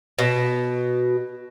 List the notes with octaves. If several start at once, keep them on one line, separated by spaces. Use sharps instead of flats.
B2